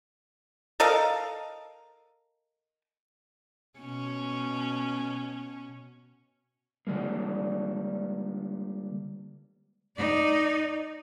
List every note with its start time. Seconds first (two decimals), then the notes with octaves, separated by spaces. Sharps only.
0.80 A4 A#4 D#5 F5
3.79 B2 C#4
6.87 D3 G3 G#3 A#3
9.96 D#4 D5